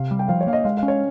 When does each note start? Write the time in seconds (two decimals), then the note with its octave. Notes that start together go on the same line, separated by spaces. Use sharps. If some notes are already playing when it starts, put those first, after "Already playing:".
Already playing: C3 F5
0.11 G3
0.19 G5
0.28 F3 F5
0.41 C#5
0.47 A#3 F5
0.53 D#5
0.64 G#3 F5
0.77 F5
0.83 C#4
0.88 C#5